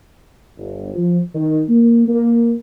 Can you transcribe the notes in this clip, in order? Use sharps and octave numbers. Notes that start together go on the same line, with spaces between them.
G1
F3
D#3
A#3
A#3